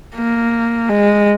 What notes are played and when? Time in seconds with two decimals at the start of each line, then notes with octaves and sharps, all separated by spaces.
0.16 A#3
0.90 G#3